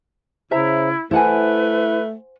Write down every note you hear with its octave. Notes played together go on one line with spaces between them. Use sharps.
C#3 E4 C5 E5 A#5
A3 E4 A4 B4 C5 F#5 G#5